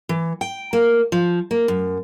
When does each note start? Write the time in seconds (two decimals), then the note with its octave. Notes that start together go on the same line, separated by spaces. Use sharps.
0.09 E3
0.41 G5
0.73 A#3
1.12 F3
1.51 A#3
1.68 F#2